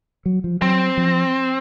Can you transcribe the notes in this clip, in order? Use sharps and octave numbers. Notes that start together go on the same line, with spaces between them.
F#3
F3
F#3 C4
F3